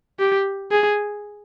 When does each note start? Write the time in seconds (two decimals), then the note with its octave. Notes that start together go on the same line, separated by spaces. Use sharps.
0.19 G4
0.72 G#4